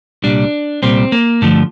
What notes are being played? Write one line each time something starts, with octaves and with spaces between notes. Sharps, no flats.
C2 A#2 G3 D4
C2 A#2 G3 C4
A#3
G2 D3 F3 A3